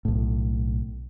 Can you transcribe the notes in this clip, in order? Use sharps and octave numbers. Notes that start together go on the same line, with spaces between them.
B1 A2